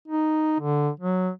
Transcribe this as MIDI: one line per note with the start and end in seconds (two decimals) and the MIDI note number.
0.08 0.58 63
0.60 0.90 50
1.00 1.30 54